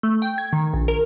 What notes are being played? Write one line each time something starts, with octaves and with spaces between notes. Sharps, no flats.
A3
G5
G#6
D#3
A#1
A#4